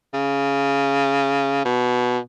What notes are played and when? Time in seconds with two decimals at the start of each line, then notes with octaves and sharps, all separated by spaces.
0.14 C#3
1.65 B2